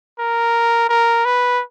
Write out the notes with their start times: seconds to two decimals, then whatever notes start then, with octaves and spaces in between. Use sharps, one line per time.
0.19 A#4
0.89 A#4
1.25 B4